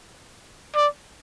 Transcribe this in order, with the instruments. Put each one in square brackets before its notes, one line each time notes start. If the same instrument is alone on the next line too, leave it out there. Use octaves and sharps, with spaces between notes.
[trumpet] D5